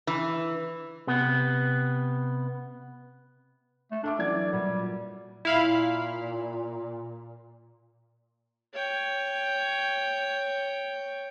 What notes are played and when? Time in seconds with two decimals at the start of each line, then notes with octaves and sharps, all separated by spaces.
0.07 E3
1.07 C3 B3
3.92 A3
4.04 D4 A4 E5 D6
4.19 E3 F#3 D5 G#6
4.53 A#2 F#3 G3
5.45 A#2 E4 F5 B5
8.73 C#5 G5